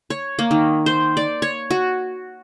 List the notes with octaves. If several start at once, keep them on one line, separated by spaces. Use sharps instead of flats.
C#5
A#3
D#3
C5
D5
C#5
F#4